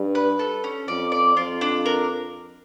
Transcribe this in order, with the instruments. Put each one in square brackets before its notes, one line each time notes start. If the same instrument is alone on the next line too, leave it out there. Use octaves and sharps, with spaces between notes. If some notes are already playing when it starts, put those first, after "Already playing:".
Already playing: [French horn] G2
[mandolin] B4
A4
C#4
[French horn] F2 [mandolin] D5
[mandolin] D5
[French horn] F2 [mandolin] F4
[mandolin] D4
A#4